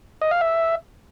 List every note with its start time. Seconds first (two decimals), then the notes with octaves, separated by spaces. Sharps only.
0.22 D#5
0.31 F5
0.41 E5